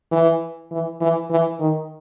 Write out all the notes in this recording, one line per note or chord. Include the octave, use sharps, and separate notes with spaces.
E3
E3
E3
E3
D#3